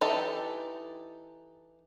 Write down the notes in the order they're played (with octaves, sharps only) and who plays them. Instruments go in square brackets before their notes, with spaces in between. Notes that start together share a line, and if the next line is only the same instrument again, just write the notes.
[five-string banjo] E3 D#4 G4 A4